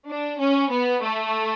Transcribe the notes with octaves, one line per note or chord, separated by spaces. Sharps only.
D4
C#4
B3
A3